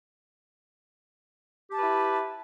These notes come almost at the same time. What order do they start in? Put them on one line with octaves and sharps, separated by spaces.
G4 A5 B4 E4